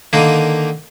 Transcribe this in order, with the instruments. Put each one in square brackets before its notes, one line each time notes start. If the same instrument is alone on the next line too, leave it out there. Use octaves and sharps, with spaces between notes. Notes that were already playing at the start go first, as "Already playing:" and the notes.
[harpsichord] D3 D#3 A#3